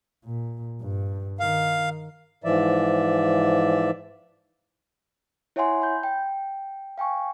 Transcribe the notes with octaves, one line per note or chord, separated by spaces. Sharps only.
A#2
G2
D#3 F5
G#2 E3 F3 D5 E5
E4 C#5 E5 F#5 G#5 C6
B5 G6
G5
F5 G5 G#5 C#6